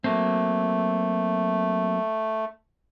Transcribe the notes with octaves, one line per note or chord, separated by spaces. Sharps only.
F#3 A3 A#3 C4